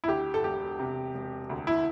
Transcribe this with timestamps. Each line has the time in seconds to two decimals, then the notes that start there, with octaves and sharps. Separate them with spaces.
0.04 E4
0.08 D2 G4
0.34 A4
0.44 E1 G4
0.79 C3
1.14 E1
1.49 D2
1.67 E4